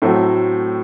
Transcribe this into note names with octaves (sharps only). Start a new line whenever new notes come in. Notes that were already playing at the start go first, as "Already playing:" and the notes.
A2 F#3 A3 C4 F#4